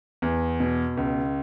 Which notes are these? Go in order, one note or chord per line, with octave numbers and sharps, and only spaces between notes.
E2
B2
C#2